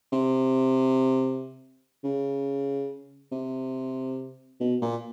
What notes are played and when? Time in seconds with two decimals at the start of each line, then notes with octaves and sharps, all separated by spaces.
0.13 C3
2.04 C#3
3.32 C3
4.60 B2
4.82 A#2